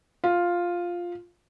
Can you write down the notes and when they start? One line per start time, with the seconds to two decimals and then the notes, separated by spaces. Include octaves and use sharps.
0.24 F4